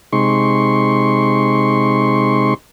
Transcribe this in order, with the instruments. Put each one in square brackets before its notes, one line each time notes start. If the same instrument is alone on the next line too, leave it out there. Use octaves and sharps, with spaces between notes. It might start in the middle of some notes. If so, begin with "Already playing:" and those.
[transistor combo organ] C3 G#3 D#4 C6 C#6